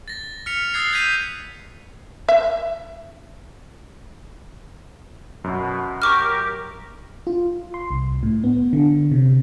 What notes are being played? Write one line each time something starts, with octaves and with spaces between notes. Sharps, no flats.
A6 A#6
F6 B6 C#7 F7
D#6 E6 F#6 G#6 A6 C7
G6 G#6 B6 D#7 F7
E5
F#2 B2
G4 A#4 C#6 D6 F6
F4
C6
C2
A2
B3
D3
C3